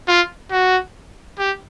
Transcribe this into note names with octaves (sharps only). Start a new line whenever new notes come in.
F4
F#4
G4